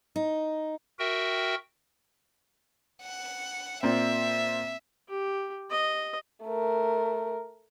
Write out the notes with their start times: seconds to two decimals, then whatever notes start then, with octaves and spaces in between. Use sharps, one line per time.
0.16 D#4
0.99 F#4 A#4 E5 G5
3.03 F#5
3.83 A#2 C4 E5
5.09 G4
5.71 D#5
6.44 A3 A#4